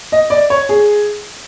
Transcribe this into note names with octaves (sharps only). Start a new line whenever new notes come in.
D#5
D5
C#5
G#4